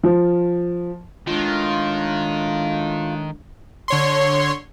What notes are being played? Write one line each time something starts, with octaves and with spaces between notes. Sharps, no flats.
F3
A2 D#3 G#3 D4 F4
D3 C#5 C6